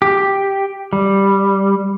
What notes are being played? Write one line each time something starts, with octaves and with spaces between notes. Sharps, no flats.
G4
G3